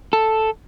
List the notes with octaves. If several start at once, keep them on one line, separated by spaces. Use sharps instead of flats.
A4